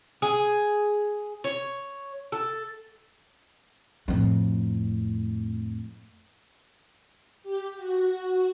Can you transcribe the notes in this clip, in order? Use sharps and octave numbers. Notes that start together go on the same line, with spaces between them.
G#4
C#5
A4
F2 A2
G4
F#4